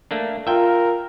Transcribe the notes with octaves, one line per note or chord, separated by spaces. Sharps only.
A3 A#3 D4
F4 A#4 E5 G5